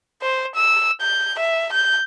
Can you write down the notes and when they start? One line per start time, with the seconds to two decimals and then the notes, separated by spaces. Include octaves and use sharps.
0.22 C5
0.56 E6
1.01 G6
1.39 E5
1.73 G6